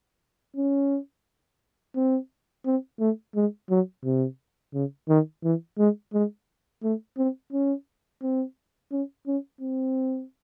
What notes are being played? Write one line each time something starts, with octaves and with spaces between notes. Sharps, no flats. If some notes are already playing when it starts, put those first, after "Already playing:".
C#4
C4
C4
A3
G#3
F#3
C3
C#3
D#3
E3
G#3
G#3
A3
C4
C#4
C4
C#4
C#4
C4